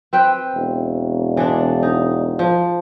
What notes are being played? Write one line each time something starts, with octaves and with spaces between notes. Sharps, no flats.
C4 B4 G5
E1
E3 G#3 D4
D#4
F3